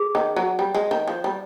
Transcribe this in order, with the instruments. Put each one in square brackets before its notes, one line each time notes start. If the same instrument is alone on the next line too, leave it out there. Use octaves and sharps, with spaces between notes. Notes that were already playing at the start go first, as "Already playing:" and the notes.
Already playing: [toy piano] G#4
[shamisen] D#3
F#3
G3
G#3
D#3
F3
G3